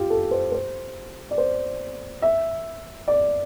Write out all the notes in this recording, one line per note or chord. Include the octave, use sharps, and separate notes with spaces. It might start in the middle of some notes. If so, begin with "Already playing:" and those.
Already playing: F4 G4
A4
C5
C5
D5
C5
E5
D5